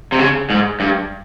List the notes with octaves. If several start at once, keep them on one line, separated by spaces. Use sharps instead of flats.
C3
C#3
G#2
G2